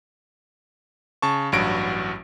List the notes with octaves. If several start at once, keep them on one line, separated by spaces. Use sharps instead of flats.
C#3 A5 C#6
A1 G2 F#3 F#4 D7